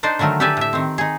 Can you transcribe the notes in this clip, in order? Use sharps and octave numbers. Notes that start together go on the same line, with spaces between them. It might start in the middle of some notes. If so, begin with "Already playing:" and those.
D4 D#4 C5 D5 D#5
D3 D#3 F#3 A3 A#4
G4 A4 B4 D5 E5 G#5
A2 E5
D#3 C4
D#4 G#4